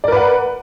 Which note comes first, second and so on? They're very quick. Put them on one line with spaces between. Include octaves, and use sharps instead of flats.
D5 A#4 B4 F#5